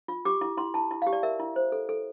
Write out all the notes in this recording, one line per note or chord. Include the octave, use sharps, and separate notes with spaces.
F4
G4 D6
E4
E4 C6
E4 A5
E4
G4 F5
D5
A#4 E5
E4
C5
A4
A4